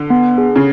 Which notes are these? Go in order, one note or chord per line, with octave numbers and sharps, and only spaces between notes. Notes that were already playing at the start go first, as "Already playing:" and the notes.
Already playing: D3
B3
G#4
C#3